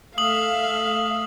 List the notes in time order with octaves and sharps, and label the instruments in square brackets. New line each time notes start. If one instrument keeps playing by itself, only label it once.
[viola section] A3 E5 F5 [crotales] D#6 F#7